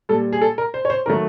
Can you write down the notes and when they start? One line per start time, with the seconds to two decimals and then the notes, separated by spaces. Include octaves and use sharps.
0.09 A#2 G3 A4
0.33 G#4
0.41 A4
0.58 A#4
0.74 C5
0.85 C#5
0.90 C5
1.06 D#3 F#3 A3 A#4